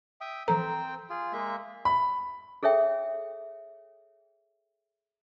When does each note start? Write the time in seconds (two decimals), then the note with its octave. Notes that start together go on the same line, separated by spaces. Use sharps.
0.21 E5 G5 D#6
0.48 E3 F3 C4 A4 C5 G5 A#5
1.10 F4 G#4
1.33 G#3 A#3 E5
1.85 B5
2.63 G#4 A4 C#5 E5 G5